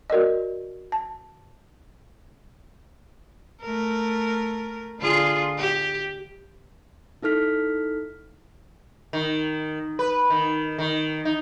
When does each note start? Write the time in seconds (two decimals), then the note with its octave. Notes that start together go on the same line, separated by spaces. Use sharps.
0.10 F#4 A#4 D5 D#5
0.92 A5
3.62 A3 A#4
5.00 D3 F4 G#4
5.58 G4
7.22 D#4 E4 A4 F6 B6
9.13 D#3
9.99 B4
10.30 D#3
10.78 D#3
11.25 D#4